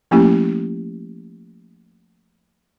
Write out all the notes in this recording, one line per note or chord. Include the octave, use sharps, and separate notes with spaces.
F3 A3 A#3 C#4 E4 G4